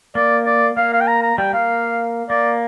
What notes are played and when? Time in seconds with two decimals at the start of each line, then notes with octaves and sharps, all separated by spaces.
0.15 A#3 D5
0.46 D5
0.77 A#3 F5
0.93 F5
1.01 G5
1.08 A#5
1.23 A#5
1.38 G3 G5
1.53 A#3 F5
2.30 A#3 D5